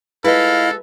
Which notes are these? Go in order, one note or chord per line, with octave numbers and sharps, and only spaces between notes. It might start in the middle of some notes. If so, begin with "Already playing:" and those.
G#3 E4 F4 A4 B4 D#5 F5